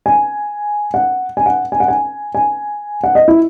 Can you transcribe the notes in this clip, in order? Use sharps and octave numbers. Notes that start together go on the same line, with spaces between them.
G#5
F#5
G#5
F#5
G#5
F#5
G#5
G#5
F#5
D#5
E4